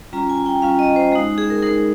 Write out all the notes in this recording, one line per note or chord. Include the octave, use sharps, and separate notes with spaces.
G3 C#4 F4 A#5
G#5
G5
G3 C#4 F4 F5
D#5
C5
G#3 D#4
G#4
A#4
G#3 D#4 A#4